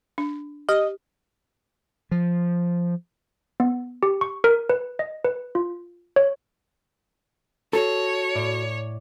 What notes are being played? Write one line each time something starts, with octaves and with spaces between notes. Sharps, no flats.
D4
G4 D#5
F3
B3
G4
C#6
A#4
B4
D#5
B4
F4
C#5
F#4 A4 C#5 C7
A2 D5